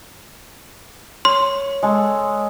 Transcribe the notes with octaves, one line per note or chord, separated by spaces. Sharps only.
C#5 C6
G#3 A4